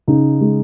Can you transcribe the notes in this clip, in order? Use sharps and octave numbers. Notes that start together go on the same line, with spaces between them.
C#3 D#4
G#3